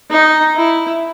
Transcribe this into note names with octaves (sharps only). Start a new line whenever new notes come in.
D#4
E4